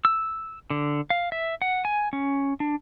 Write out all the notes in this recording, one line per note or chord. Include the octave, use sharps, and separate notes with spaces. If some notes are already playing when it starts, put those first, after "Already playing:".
E6
D3
F5
E5
F#5
G#5
C#4
D4